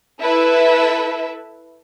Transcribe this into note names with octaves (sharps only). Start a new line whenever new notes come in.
E4 A4 B4 E5